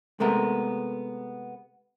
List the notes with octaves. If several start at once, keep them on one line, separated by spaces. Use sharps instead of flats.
C3 G#3 A3 B3 A#4